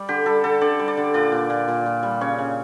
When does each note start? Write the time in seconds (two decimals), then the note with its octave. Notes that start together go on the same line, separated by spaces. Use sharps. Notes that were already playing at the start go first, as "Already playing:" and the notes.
Already playing: G3 D5
0.09 D3 G4
0.26 G3 A4
0.44 D3 A4
0.61 D3 D5
0.79 G3
0.88 D5
0.97 D3
1.14 A#2 D5
1.32 A#2
1.50 A#2
1.68 A#2
1.86 A#2
2.03 G3
2.21 C#3 C#5
2.39 C#3